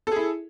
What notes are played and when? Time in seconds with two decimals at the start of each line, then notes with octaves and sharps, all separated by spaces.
0.07 A4
0.12 G#4
0.16 E4